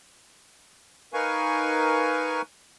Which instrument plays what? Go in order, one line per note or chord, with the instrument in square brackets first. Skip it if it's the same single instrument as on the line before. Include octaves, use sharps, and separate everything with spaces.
[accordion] D#4 A#4 B4 F5 G#5 C#6